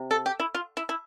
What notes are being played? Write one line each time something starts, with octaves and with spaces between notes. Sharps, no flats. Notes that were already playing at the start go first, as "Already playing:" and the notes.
Already playing: C3
A4
G4
E4
F4
E4
E4